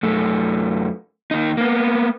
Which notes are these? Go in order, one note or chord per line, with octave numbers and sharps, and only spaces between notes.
F#2 A3
D#2 D#4
A#3 B3